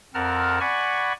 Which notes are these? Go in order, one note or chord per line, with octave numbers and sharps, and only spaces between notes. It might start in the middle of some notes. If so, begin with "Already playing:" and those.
F2 C4 A#4 F#5 A5 F6
D5 F#5 G#5 B5 C#6